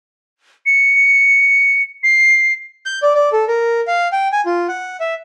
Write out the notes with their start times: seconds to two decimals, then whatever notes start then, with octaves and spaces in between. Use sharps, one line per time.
0.66 C#7
2.03 C7
2.86 G6
3.03 D5
3.15 D5
3.32 A4
3.48 A#4
3.87 F5
4.13 G5
4.32 G#5
4.46 F4
4.68 F#5
5.00 E5